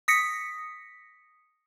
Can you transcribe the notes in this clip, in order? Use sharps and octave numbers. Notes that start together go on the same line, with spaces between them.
D#6 A#6 B6 C#7